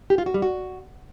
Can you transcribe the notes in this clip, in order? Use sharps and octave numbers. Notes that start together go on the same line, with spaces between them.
G4
F4
F#4
G3
F#4